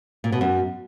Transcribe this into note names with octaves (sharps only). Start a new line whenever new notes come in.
A#2
B2
F#2